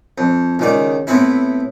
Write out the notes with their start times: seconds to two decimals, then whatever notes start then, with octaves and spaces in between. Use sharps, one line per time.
0.18 F2
0.59 C#2 D#3 D5
1.07 A2 B3 C4 E4